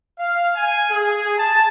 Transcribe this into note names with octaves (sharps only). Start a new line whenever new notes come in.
F5
G#5
G#4
A5